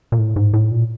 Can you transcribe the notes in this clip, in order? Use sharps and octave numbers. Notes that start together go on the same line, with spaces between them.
A#2
A2
G#2
A2
A#2